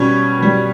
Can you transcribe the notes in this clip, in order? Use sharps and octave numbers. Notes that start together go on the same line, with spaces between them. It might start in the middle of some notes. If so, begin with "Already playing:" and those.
Already playing: B2 G3 C#4 C#5
B2 G3